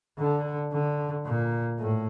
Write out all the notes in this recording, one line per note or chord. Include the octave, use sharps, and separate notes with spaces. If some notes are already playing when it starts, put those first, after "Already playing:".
D3
D3
A#2
A2